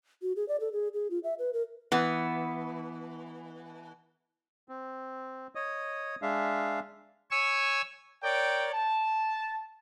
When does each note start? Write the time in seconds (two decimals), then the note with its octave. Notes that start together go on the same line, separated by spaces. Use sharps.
0.22 F#4
0.36 G#4
0.48 D5
0.60 A4
0.72 G#4
0.94 G#4
1.11 F4
1.24 E5
1.39 B4
1.53 A#4
1.92 E3 B3
4.69 C4
5.55 C#5 D#5 D#6
6.22 G#3 D4 E5 F5
7.31 C#5 G#5 C#6 E6
8.23 A#4 C#5 D5 G5
8.73 A5